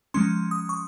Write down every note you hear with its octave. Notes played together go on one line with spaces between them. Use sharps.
F3 G#3 C#4 C6
D#6
C#6